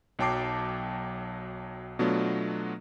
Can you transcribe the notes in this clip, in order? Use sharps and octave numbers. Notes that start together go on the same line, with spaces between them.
B1 F#3 G5 A5 D6 C7
B2 F#3 A3 B3 D4 F4